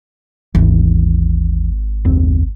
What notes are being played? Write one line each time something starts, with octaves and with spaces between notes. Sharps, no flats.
G#1 D#2 E3
F#1 D#2 C4